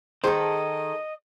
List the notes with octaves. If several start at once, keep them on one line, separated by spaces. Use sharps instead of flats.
D#3 G#4 A4 C5 D#5